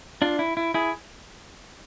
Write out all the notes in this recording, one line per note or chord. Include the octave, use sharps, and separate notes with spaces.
D4 F4
E4
E4
E4 G#4